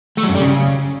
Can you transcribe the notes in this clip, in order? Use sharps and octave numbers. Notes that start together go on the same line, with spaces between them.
A3
F#3
F#2
G3
C#3